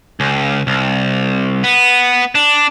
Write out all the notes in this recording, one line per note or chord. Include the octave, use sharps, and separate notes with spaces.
C#2
C2
B3
D4